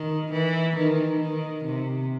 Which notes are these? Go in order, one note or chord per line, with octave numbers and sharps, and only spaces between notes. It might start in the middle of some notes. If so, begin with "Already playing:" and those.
Already playing: D#3
E3
D#3
D#3
C3